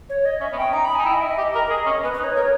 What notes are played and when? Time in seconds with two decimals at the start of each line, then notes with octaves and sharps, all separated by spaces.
0.10 C#5
0.25 D#5
0.41 C#4 E5
0.53 B3
0.58 C#4 G5
0.73 D#4 A#5
0.85 B5
0.95 D#4 G#5
1.06 E4 G5
1.14 D#5
1.22 E5
1.31 D#5
1.38 G4
1.55 A#4
1.70 G#4
1.86 C#4
2.03 B3 B4
2.14 B4
2.19 D#4
2.24 C#5
2.35 A#4 C#5